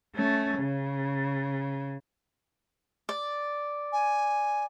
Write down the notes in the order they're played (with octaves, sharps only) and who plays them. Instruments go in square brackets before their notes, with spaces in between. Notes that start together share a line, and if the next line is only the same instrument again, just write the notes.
[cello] A3 C#4
C#3
[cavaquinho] D5
[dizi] G#5